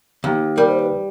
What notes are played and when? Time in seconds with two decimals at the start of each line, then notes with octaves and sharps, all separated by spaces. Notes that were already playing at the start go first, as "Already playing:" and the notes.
0.24 D#2
0.57 G3 A#4
0.68 C5
0.79 B4